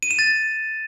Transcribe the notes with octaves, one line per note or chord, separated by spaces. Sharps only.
D#7
E7
A6